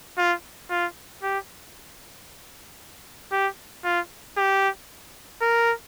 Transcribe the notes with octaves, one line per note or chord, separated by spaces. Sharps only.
F4
F4
G4
G4
F4
G4
A#4